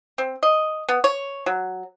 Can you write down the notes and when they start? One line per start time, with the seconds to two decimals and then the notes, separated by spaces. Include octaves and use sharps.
0.18 C4
0.43 D#5
0.89 B3
1.04 C#5
1.46 F#3